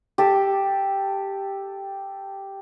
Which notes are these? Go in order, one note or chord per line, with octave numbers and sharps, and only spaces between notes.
G4 A4